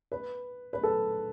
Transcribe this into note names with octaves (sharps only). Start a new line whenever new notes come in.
B4
B4
A4